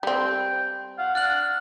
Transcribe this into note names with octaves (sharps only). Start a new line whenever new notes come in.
G3 C4 G5
F5 F#5
D4 F6 F#6 F#7